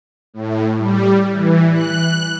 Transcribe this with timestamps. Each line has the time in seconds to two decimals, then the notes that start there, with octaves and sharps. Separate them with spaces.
0.34 A2
0.78 G3
1.32 E3
1.74 F#6